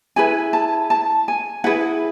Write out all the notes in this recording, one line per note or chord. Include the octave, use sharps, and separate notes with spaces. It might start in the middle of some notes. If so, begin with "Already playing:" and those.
E4 G#4 B4 G#5
A5
A5
G#5
E4 G#4 B4 F#5